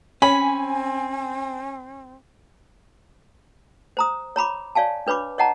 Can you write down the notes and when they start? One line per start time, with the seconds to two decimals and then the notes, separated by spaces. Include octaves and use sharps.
0.22 C4 C#4 G#5 B5
3.97 C5 A#5 D#6
4.36 C#5 A#5 B5 D6
4.75 C#5 D5 F5 G#5 A5
5.07 D4 B4 C#5 B5 D6
5.38 C#5 D#5 F#5 A5 A#5